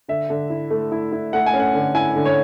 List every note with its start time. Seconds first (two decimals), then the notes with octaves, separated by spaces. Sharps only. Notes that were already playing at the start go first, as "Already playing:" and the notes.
0.08 D3 E5
0.30 D3
0.50 E4
0.71 A3
0.92 E4
1.13 E4
1.33 A3 F#5
1.46 G#5
1.54 C#4
1.60 F#5
1.74 D3
1.95 E4 G#5
2.16 D3
2.26 C#5